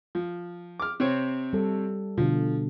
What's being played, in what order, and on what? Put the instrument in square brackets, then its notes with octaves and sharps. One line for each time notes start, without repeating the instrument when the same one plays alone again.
[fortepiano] F3
D6 F6
C3 C4 C#5
[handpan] G3 A4
[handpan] B2 D3 [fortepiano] F3